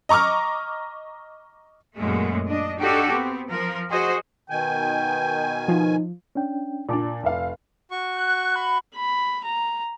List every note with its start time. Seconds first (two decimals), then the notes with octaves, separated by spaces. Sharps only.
0.09 D#5 A#5 C#6 D6 F6
1.96 F#2 A#2 G#3 A3
2.47 D4 D#5
2.79 D4 D#4 F#4 G4 A4
3.11 B3 C4
3.48 F3 A#4
3.88 F#4 G#4 C5 D#5
4.50 B2 D#3 G5 G#5
5.68 F3 D#4
6.35 C#4 D4 G5
6.89 A#2 D4 D5 A5 D6
7.23 F1 E5 F5
7.91 F#4 C#6
8.17 F#6
8.56 B5
8.95 B5
9.44 A#5